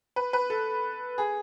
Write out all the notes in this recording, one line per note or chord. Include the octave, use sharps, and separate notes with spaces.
B4
B4
A4
G#4